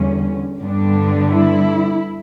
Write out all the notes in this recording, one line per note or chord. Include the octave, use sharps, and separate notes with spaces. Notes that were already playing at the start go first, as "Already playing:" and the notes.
Already playing: E2 D3 G3 C#4
G2 D3 G3 B3 D4
E4